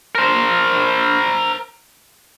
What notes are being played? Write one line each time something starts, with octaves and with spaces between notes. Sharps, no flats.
A#4 C5